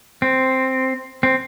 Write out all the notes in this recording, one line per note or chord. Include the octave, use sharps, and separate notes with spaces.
C4
C4